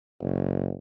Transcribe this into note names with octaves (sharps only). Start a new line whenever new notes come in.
F#1